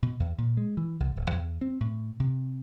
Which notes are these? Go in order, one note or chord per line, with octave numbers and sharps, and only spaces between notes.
B2
E2
A#2
G#3
E3
C2
D1
E2
C4
A2
C3